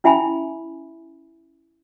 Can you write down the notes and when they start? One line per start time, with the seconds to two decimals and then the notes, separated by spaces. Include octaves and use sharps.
0.04 C#4 E4 E5 G#5 B5